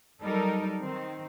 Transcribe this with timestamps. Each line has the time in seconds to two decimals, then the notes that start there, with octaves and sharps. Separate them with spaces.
0.22 F#3 G3 D#4 A4 A#4
0.81 D#3 C4